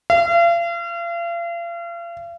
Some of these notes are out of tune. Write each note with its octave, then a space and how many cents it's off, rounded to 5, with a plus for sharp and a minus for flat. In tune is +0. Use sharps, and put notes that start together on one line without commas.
F5 -40